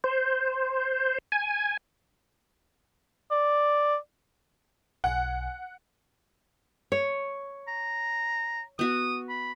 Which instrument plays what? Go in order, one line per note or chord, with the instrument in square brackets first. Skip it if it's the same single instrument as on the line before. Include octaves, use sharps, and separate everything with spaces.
[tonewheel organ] C5
G#5
[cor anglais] D5
[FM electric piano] B1 G#5 F#6 [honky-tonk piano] F#5
[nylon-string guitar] C#5
[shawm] A#5
[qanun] B3 F#4 [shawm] D#6
[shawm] B5